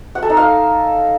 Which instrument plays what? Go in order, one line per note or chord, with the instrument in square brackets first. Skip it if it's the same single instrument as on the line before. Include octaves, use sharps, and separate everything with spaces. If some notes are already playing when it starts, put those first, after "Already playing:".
[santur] F#5
A4
D#4
F5